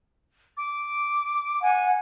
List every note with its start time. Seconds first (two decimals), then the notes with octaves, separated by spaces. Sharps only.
0.57 D6
1.62 F#5 G#5